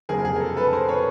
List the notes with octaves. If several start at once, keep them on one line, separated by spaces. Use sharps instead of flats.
F#1 F2 C3 G#4 A#4
G#4
A#4
A4
A4 B4
B4
A#4 C5
B4 C#5